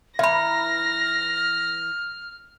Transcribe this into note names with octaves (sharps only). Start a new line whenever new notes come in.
E3 E5 A#5 B5 F6 A#6